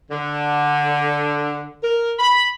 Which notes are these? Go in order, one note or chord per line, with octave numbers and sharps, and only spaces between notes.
D3
A#4
B5